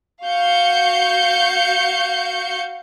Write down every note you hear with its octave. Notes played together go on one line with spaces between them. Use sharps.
F#4 F5 G6 C#7